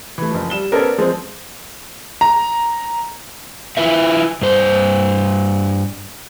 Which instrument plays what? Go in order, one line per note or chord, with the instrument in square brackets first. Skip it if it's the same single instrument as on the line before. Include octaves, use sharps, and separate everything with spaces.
[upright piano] E3 A3
F#1 F3
G3 E7 G7
[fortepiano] B3 C#4 A4 [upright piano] A#4 C5 D5
[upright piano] F3 [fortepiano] G#3 C4
[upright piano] A#5
[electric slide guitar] E4 F4 B4 E5
G2 C5